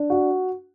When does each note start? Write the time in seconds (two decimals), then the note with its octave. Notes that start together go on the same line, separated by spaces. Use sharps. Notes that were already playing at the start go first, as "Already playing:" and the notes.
Already playing: D4
0.10 F#4